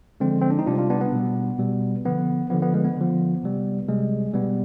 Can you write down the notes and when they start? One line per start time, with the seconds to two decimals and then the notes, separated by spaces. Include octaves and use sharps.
0.20 D3 F3 G#3 C4
0.41 C4
0.50 D4
0.59 D#4
0.66 C3 G3 D4 F4
0.78 D4 F4
0.90 B3 D4
1.01 B3
1.12 B2 G3
1.58 B2 G3
2.05 D3 F3 B3
2.50 D3 F3 B3
2.62 B3
2.74 G#3
2.84 B3
2.97 D3 F3
3.43 C3 G3
3.88 C3 G3 G#3
4.34 B2 G3 B3